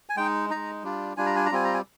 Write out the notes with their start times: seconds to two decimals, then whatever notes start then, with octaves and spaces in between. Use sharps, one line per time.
0.09 G#5
0.17 G#3 D#4 G5
0.50 G#3 D#4 A#5
0.84 G3 D4 F4
1.17 G3 D4 F4 G#5
1.26 A#5
1.36 G#5
1.46 A#5
1.51 G3 C4 F4 G#5
1.64 A#5
1.74 G#5